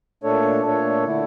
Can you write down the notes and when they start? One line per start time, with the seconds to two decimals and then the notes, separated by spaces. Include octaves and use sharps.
0.24 A#2 A3 D4 A4 C#5
0.64 A#2 A3 D4 A4 C#5
1.05 D3 A3 E4